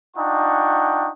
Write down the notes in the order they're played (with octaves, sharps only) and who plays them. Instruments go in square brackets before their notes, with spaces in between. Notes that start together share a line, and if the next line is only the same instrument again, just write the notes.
[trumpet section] D4 D#4 F4 F#5 G5 C#6